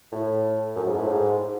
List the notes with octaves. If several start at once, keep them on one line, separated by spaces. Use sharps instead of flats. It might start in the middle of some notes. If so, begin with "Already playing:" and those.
A2
F#2
G#2
A2
G#2